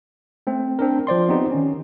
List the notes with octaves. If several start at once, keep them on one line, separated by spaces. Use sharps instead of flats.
A3 C4
C4 D4 A#4
F3 C5 D5 C6
B3 C4 D#4 G4
D#3 C#4